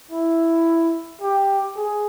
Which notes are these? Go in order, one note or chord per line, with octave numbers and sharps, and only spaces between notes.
E4
G4
G#4